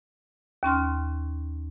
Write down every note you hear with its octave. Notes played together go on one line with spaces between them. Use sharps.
D#2 C#4 C6 F6